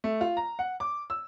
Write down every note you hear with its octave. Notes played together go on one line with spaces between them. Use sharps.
A3
F4
A#5
F#5
D6
E6